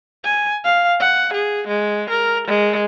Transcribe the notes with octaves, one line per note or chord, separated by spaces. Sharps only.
G#5
F5
F#5
G#4
G#3
A#4
G#3